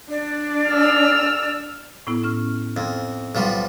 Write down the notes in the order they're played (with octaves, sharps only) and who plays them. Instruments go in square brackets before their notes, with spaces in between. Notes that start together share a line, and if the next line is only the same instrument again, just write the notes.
[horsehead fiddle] D4 [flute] D5
[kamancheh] E6 F6
[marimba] A2 B3 E4
C#4 F6
[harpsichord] F2
B1 F3 G3